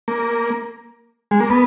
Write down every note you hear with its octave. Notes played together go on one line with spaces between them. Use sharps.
A#3
G#3
A#3
B3